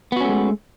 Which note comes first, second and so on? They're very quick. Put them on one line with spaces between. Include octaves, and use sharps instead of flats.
B3 F#4 C#4 A3 G#3